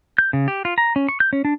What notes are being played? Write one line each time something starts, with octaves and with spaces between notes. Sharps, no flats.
G6
C#3
G4
F4
A#5
C#4
C#6
G6
C#4
D4